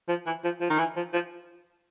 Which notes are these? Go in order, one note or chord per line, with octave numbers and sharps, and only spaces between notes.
F3
E3
F3
F3
D#3
E3
F3
F3